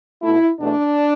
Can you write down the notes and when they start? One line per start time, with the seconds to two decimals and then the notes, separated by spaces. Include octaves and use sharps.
0.22 B2 A3 E4
0.59 E2 B2 A3 D4